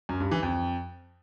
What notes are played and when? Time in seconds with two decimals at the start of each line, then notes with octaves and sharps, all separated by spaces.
0.09 F#2
0.20 G2
0.31 E3
0.43 F2